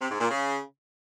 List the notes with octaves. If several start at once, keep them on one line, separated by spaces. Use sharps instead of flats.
C3
G#2
A#2
C#3